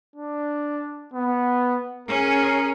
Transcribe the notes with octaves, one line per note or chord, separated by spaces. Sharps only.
D4
B3
C#4 G#4 A#4